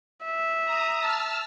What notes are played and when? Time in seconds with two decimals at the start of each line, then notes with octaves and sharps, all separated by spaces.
0.25 E5
0.65 A#5 D#6
1.00 A5 E6 F6